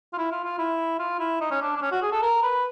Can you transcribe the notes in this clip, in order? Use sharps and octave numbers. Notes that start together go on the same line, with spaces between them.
F4
E4
F4
F4
E4
F4
E4
D#4
C#4
D4
D4
C#4
F#4
G#4
A4
A#4
B4